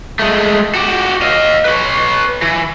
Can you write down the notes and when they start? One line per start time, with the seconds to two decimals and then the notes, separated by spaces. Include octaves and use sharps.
0.19 G#3 A3
0.75 F#4 G4
1.22 D#5 F5
1.65 B4 C#5
2.42 E3